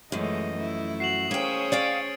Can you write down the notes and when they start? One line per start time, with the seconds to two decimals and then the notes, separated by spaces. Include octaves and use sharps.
0.12 F#2 E3 F3 G#3 A3 D#5
0.56 A3 E4
1.00 F#4 C7 E7 F#7
1.31 A#3 C#4 G#4 C5 C#5 G5 D#6
1.72 D5 F5 G5 A6 D7